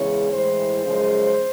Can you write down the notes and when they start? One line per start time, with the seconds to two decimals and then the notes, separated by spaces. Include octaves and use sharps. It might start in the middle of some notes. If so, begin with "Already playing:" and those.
Already playing: E2 C#3 E3 G#3 C#5
0.32 A2 E3 G#3 C5
0.85 F#2 C#3 F3 G#3